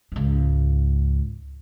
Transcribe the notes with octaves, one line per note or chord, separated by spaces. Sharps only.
C#2 G#2